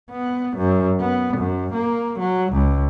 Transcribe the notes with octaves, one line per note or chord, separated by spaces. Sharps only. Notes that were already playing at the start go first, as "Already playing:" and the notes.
B3
F#2
B3
F#2
A#3
F#3
C#2